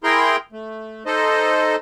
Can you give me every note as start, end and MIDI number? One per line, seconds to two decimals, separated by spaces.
0.04 0.36 64
0.04 0.36 68
0.04 0.36 70
0.04 0.36 79
0.04 0.36 82
0.04 0.36 84
0.52 1.03 57
1.06 1.76 63
1.06 1.76 69
1.06 1.76 72
1.06 1.76 75